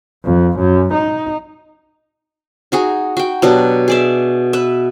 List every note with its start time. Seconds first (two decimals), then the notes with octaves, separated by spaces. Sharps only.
0.25 F2
0.60 F#2
0.94 D#4
2.72 D#4 F#4 G#4
3.17 F#4 G5
3.42 B2 F#3 D4 G4
3.88 G#4 D5 E5
4.53 B4 E5